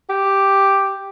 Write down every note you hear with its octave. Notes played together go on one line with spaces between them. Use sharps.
G4